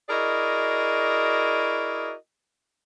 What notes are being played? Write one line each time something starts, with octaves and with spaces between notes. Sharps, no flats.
E4 F#4 G#4 A#4 D5 D#5